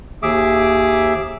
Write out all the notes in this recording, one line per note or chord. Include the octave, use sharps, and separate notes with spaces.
D#2 G#4 E5 D6